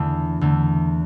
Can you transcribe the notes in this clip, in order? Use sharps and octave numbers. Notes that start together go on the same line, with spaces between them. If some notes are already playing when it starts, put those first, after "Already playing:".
Already playing: E2 D3 A3
E2 D3 A3